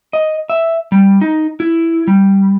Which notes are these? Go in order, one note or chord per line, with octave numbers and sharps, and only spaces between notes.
D#5
E5
G3
D#4
E4
G3